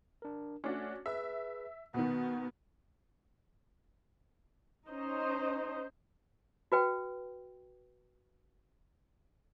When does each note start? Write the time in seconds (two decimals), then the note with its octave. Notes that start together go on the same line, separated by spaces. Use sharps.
0.22 D4 A#4
0.64 A3 C#4 D4 F#4
1.06 G#4 B4 E5
1.94 B2 D#3 B3 F#5
4.89 C#4 D#4 C5 D#5
6.72 F#4 B4 G5